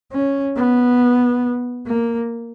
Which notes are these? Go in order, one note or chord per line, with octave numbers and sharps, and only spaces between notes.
C#4
B3
A#3